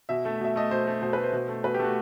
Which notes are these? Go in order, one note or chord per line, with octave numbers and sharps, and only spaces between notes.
B2 E5
A3
B2 E5
A3 D#5
B2 C5
A3
B2 C5
A3 B4
C5
B2
A3
B2 B4
G4
A3 F#4